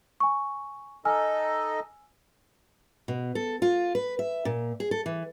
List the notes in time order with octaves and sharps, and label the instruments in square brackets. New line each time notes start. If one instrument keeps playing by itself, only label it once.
[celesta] G#5 C#6
[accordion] D#4 A4 D#5 [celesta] G#5 E6 F6
[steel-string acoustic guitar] B2
A4
F4
B4
E5
A#2
G#4
A4
E3